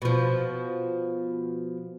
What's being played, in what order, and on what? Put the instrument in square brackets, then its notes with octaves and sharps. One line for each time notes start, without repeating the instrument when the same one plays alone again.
[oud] B2 F3